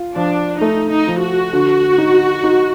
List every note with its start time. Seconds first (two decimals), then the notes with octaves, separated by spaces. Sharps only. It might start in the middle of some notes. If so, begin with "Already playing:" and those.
Already playing: F4
0.16 F3 D4
0.61 A3 D#4
0.91 D#4
1.07 F3
1.23 F#4
1.53 D3
1.98 D#4
2.44 D#4